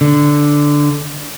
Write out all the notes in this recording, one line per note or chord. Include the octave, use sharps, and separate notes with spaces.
D3